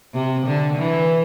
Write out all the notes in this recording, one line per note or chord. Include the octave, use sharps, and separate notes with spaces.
C3
D3
E3